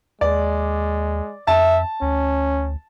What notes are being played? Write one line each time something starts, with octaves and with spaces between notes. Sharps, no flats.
D#2 G#3 D5
F2 E5 A5
D2 C#4